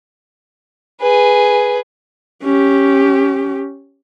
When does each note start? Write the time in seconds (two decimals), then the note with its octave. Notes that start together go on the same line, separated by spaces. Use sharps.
1.01 G#4 B4
2.42 C#4 G4